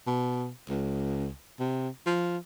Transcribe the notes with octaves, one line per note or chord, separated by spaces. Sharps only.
B2
C#2
C3
F3